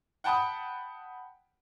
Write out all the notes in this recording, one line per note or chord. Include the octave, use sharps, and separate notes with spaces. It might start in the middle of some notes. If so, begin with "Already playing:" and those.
F#5 G5 A5 B5 D#6